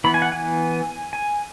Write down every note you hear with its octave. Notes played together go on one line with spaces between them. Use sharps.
E3 B3 B5
G#5
F#5
G#5
G#5